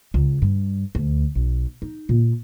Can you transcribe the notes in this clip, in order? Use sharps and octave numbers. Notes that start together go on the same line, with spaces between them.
C#2
G2
D2
B1
D#4
A#2